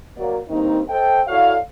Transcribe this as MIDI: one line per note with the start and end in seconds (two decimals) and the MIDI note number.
0.17 0.37 54
0.17 0.37 58
0.17 0.37 74
0.49 0.81 43
0.49 0.81 51
0.49 0.81 58
0.49 0.81 60
0.49 0.81 63
0.89 1.21 69
0.89 1.21 72
0.89 1.21 75
0.89 1.21 79
1.27 1.55 64
1.27 1.55 66
1.27 1.55 69
1.27 1.55 73
1.27 1.55 74
1.27 1.55 77